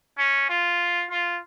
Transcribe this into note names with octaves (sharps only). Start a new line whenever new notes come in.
C#4
F4
F4